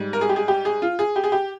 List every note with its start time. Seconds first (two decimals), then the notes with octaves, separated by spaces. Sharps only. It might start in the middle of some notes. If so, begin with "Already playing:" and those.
Already playing: G#2 G3
0.13 A#4
0.21 G#4
0.29 G4
0.36 G#4
0.48 G4
0.65 G#4
0.82 F4
0.99 G#4
1.16 G4
1.24 G#4
1.32 G4